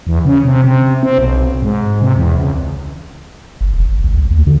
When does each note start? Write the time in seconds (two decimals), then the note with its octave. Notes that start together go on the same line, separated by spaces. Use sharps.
0.07 E2
0.25 C#3
0.45 C3
0.64 C3
1.03 C4
1.18 B1
1.62 G#2
2.02 C3
2.16 E2
2.36 C#2
3.61 G1
3.73 E1
3.85 G#1
4.04 C#2
4.17 C#2
4.31 D#2
4.47 D3